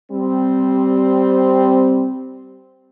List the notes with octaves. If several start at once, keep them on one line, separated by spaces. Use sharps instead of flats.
G3 C4